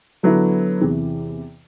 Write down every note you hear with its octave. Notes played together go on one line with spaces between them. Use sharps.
D3 F#3 B3 E4
E2 C3 E3